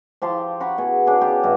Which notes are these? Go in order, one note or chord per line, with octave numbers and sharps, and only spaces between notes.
F3 G4 A5 C6
F#5 A#5 B5 C#6
B2 G#4
C#3 D4 G#4
B3 G4
G2 E4 F#4